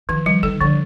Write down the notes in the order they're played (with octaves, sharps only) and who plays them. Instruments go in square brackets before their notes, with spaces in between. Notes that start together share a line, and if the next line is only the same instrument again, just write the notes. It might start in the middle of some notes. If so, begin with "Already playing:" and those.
[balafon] D#3 [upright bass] F3
[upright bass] F3 [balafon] G3
[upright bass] D#3 [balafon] A4
[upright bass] D3 [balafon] F3